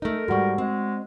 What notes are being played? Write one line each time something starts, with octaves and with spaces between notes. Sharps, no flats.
A3 D#4 A#4
G#2 G3 F#4 F#5 C#6
G#3 C4